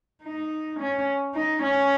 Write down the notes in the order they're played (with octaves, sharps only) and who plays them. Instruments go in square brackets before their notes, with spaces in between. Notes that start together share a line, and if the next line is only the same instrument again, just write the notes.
[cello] D#4
C#4
D#4
C#4